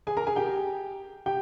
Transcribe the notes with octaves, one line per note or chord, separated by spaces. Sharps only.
G#4 G#5
A#4 A#5
G#4 G#5
G4 G5
G4 G5